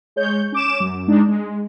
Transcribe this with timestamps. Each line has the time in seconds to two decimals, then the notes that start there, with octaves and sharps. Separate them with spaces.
0.16 G#3 C#5 G6
0.52 C#4 D6 E7
0.80 F#2
1.07 G#3 D4 D#4
1.28 G#3